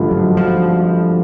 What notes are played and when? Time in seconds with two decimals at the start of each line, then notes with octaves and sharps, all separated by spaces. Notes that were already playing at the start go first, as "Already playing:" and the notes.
Already playing: G#1 G2 D3 F3 A3
0.11 F#3
0.37 F3